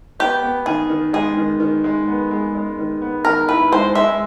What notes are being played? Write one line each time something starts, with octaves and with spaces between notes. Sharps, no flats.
B3 G4
B3
D#3 G#4
D#3
G#3 G#4
D#3
D#3
G#3
B3
G#3
G#3
D#3
B3
D#3 A#4
E4 B4
G#3 C5
G#3 E5